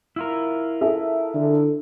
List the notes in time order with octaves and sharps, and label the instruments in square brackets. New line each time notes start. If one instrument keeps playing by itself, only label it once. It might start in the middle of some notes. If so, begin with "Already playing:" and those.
[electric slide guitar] E4 F4 A#4
[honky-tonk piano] G#4 A4 E5
[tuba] D3